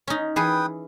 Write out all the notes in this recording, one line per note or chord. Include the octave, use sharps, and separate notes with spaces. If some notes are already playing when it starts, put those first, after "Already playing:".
C#4 D#4
E3 G#4 B4 G5 D#6